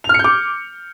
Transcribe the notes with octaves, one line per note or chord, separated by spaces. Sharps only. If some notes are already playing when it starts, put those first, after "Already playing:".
F7
F6
C#7
G6
D6